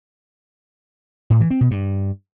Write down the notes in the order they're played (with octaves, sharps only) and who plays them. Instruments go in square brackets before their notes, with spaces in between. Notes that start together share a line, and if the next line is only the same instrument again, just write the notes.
[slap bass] A2
E3
C4
B2
G2